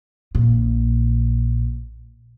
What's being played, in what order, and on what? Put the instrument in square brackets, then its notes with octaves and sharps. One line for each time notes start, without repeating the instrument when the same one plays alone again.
[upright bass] A#1 A#2